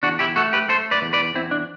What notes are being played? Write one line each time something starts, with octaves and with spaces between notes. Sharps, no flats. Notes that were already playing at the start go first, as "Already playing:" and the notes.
E2 D4 F#4
E4 G4
A3 F#4 A4
G4 B4
A3 A4 C5
B4 D5
E2
B4 D5
E2 C4 E4
D4